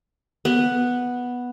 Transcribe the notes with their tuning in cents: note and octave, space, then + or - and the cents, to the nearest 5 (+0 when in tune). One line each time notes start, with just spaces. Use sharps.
B3 -5